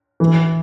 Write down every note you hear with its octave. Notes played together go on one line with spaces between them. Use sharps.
E3